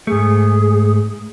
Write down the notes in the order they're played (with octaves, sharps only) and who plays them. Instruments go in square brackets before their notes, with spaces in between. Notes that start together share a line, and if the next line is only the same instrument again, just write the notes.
[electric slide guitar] G#2 A3 [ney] G#4